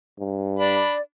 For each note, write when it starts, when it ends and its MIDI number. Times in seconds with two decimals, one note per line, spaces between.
0.19 0.83 43
0.59 0.93 62
0.59 1.01 74
0.59 0.93 83